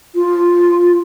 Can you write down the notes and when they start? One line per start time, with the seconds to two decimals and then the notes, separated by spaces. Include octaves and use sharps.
0.15 F4